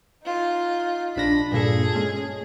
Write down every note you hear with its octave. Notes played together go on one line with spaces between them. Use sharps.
D#4 F4
A#1 D4 B5 A#6
G2 A#2 G#4 A4
G#3 C#4